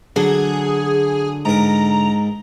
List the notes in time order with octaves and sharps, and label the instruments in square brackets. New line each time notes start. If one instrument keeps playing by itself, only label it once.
[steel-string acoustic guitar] D3 [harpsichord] F#3 [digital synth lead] G#4
[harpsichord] G#2 A#4 [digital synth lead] A#5